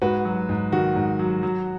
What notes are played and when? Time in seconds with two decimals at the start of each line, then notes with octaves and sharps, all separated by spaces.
0.02 G#2 F#4 B4
0.25 F#3
0.49 G#2
0.72 D#3 F#4
0.96 G#2
1.19 F#3
1.43 F#3